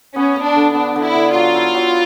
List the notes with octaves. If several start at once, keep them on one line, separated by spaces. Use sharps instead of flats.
B3 C#4
B3
D4
D3
B3 D4
D3
E4
D3
F#3 F4
E4
F#3